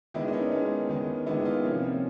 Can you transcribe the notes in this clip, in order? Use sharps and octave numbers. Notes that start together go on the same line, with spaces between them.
D#3 G#3 B3 D4 E4
D4
C#4 D#4
D#3 G#3 B3
D#3 G#3 B3
D#3 G#3 B3 D4 E4
D#4 F4
C3 F3 A#3 C#4
C#4